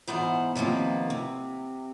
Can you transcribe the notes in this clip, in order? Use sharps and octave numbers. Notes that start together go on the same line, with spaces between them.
G#2 E3 B3 C5 F#5
C3 D#3 F3 A#3 B3
C3